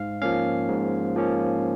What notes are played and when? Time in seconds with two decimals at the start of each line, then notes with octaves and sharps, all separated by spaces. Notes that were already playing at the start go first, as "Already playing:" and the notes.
Already playing: G#2 F5
0.22 F3 A#3 C#4 F5
0.69 G#2
1.16 F3 A#3 C#4